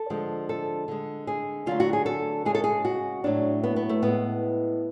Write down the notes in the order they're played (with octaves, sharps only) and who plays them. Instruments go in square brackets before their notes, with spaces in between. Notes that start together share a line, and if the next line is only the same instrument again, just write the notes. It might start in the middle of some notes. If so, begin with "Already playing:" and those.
Already playing: [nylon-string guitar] A4
D3 F3 G#3
A4
D3 G#3
G#4
D3 F#3 A3 F4
F#4
G#4
A4
C#3 G#3 G#4
A4
G#4
F#4
A2 F#3 A3 D4
B3
B3
A3
A2 G#3 B3